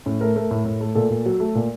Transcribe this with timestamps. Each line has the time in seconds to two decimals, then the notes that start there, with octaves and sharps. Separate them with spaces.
0.06 A2 C#4
0.21 A3 A#4
0.36 A3 A#4
0.51 A2
0.65 A2
0.81 A3
0.95 A#2 A4
1.10 A#2
1.26 F#3
1.40 A3
1.55 A#2